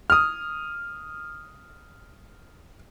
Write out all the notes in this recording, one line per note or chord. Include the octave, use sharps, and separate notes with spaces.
D#6 F6